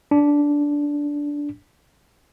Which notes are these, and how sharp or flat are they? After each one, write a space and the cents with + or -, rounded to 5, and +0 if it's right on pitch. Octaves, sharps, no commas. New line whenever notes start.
D4 -10